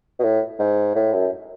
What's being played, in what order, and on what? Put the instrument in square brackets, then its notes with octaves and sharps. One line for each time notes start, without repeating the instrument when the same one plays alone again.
[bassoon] B2
A2
G#2
A2
F#2